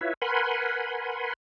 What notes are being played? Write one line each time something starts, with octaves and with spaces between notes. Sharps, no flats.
E4 F4 B4 C#5 E5
A#4 B4 F#5 G#5 B5 C6